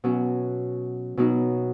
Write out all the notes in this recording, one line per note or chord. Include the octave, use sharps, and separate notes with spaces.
B2 F#3 C#4
B2 F#3 D#4